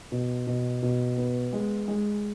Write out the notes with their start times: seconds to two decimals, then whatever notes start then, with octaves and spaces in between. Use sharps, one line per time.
0.12 B2
0.47 B2
0.82 B2
1.17 B3
1.53 G#3
1.88 G#3